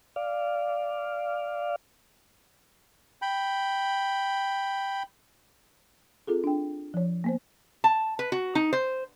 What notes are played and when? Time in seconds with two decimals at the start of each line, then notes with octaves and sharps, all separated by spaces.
0.16 D5 F5
3.22 G5 B5
6.27 C4 F4 G#4 A4
6.44 D4 G5
6.94 F3 C#5
7.24 A#3 B3 C5
7.84 A5
8.19 B4
8.32 F#4
8.55 D#4
8.73 C5